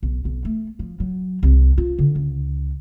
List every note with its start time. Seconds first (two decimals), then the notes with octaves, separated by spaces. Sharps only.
0.03 B1
0.25 B1
0.45 A3
0.79 F3
1.00 F#3
1.43 C2
1.78 F4
1.99 D3
2.16 C#2